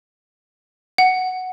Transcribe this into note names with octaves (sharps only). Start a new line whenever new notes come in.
F#5